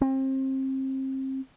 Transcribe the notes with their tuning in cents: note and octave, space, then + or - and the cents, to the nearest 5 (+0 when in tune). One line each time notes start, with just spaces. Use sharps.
C4 +30